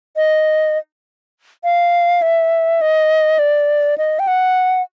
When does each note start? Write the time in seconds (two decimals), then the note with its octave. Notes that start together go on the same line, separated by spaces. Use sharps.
0.16 D#5
1.64 F5
2.22 E5
2.81 D#5
3.39 D5
3.98 D#5
4.19 G5
4.27 F#5